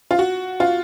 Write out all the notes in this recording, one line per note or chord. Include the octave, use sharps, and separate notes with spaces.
F4
F#4
F4